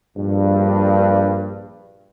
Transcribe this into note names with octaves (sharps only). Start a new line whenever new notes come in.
A#1 G2